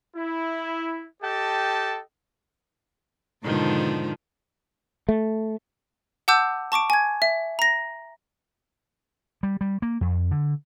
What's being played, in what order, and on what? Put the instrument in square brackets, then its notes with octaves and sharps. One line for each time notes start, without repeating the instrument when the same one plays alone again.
[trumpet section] E4
G4 A4 D#5 G5 A5
[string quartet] G#2 B2 D3 D#3 F3 D4
[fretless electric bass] A3
[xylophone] F#5 A5 D6 E6 G6
A5 C#6 D6 D7
G#5 G#6
E5
A#5 A#6
[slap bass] G3
G3
A#3
F2
D3